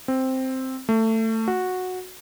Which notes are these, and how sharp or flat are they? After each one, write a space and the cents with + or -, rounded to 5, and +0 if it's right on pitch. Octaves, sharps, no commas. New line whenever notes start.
C4 +0
A3 +20
F#4 -10